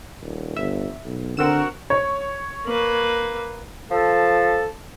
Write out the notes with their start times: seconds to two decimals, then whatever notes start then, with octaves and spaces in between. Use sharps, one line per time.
0.21 D#1
0.56 G1 E5
1.05 B1
1.37 D3 C4 F#4 A#4 E6 E7
1.90 C#5
2.66 A#3 B4
3.91 F3 A4